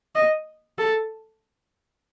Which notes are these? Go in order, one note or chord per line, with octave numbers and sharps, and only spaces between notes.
D#5
A4